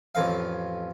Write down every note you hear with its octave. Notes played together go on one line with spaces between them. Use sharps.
A1 F2 F5